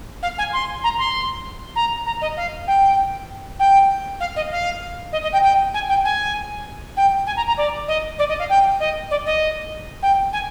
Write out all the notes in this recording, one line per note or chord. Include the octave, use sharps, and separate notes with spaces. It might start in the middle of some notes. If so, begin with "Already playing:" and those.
F5
G#5
C6
A#5
C6
A#5
A#5
D#5
F5
G5
G5
F5
D#5
F5
D#5
D#5
G5
G5
G#5
G5
G#5
G5
G#5
A#5
A#5
D5
D#5
D5
D#5
F5
G5
D#5
D5
D#5
G5
G#5